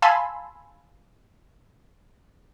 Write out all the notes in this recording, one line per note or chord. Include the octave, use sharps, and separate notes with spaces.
F5 G#5 A5 B5 C6 E6